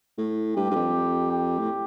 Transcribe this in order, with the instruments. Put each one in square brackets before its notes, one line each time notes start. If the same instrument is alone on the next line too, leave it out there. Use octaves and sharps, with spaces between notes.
[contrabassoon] A2
[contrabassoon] G2 [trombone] G4
[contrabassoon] G2
F2
[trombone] G4
[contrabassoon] A2